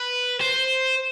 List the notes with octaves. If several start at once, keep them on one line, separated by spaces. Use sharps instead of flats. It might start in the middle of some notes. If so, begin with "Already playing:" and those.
Already playing: B4
C5